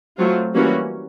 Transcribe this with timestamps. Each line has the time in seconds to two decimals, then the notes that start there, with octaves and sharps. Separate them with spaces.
0.18 F#3 A3 C4 F4
0.54 E3 G3 A#3 C#4 F#4